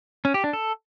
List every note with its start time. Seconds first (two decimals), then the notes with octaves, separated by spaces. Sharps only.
0.25 C#4
0.34 G4
0.44 D4
0.53 A4